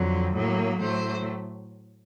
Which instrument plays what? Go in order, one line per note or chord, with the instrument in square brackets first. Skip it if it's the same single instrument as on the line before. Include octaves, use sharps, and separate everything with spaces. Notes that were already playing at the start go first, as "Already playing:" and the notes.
Already playing: [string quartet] F2 D3 F#3
A2 F#3 A#3
A2 F#3 A3 C5